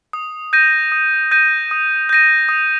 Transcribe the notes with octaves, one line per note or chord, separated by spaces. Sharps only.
D#6
G6 A#6 D#7
D#6
G6 A#6 D#7
D#6
G6 A#6 D#7
D#6